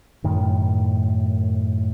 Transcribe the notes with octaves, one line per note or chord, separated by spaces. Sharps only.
F#2 A2 D#3